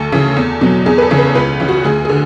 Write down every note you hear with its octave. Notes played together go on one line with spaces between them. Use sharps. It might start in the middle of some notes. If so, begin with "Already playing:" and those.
Already playing: D2 A4
C#3 E3
E2
B2 F#3
E2 G#4
B4
A4
C#3 E3
B4
C#2 B4
C#3 E3
F#4
D2 G#4
G#4
D3